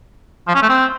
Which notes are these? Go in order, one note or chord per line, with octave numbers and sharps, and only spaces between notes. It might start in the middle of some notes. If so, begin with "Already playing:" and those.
F3
C#4
A3
C4